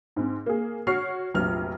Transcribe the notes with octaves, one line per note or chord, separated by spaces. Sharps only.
G#2 C4
A#3 G#4
F#4 C#5 C#6 F6 C7
F1 A#1 F#3 F6